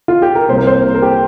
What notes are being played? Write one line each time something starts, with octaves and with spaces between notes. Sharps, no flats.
F4
G4
A#4
C2 C3 A#3 C5
A#4
C5
A#4
G4